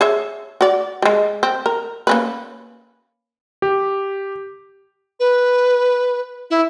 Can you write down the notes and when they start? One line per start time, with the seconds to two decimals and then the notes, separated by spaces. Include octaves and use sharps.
0.01 G#4 C#5 E5
0.61 F#4 D5
1.02 G3 G#3
1.43 C4
1.66 A#4
2.07 A#3 C#4 B4
3.62 G4
5.20 B4
6.50 E4